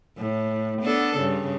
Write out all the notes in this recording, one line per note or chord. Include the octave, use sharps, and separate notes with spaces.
A2
B3 D4 A4
G2 C#3